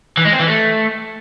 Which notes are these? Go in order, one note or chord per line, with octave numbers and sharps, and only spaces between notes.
E3
G#3
C4
E3
A3